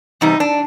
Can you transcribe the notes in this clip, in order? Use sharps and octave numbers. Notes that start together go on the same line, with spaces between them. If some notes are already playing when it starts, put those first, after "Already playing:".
E2 C3 G3 D#4
D4